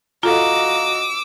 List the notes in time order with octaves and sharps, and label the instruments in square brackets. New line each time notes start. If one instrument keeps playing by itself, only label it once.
[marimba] F4 A4 [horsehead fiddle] F#4 D#5 [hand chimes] F5 A#5 [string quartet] D6 E6